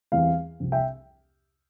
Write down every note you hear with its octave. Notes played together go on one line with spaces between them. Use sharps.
E2 E3 G3 C4 E4 F5
C2 C3 F3 C4
E5 G5